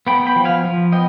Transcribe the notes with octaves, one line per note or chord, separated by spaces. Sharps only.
B3 G5 B5
G5 B5
F3
F5 G#5
F3
B3 D#5 G5